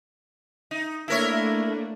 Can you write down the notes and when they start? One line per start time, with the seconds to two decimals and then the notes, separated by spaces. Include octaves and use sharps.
0.71 D#4
1.08 A3 A#3 D4 E4 A#4 C#5